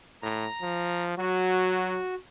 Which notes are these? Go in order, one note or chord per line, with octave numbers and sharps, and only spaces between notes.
A2 A#5
F3
F#3 F#4